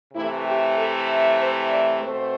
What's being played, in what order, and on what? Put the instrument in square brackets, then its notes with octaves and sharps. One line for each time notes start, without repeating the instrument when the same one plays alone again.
[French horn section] C3 E3 A3 E4
G4
A4
C5
D5
B2 A3 C4 C5